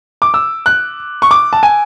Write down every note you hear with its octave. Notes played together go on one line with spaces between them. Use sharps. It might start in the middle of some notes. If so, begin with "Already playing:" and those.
D6
E6
F#6
C#6
D6
A5
G#5